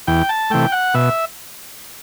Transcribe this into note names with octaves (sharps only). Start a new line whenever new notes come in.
E2 G5
A5
C3 E3 A3 G5
F#5
B2 E5